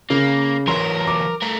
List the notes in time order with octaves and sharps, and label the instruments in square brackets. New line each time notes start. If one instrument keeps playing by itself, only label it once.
[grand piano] C#3 [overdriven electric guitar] A#3
[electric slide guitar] E3 F#3 C#5 [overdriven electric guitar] A#4 [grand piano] C6
[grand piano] D6
[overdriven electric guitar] A3 A#4